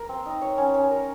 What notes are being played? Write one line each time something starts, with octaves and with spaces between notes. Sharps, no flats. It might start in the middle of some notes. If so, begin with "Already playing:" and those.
Already playing: A#4
C4
D#4
C#5
C#4
C#4
A#4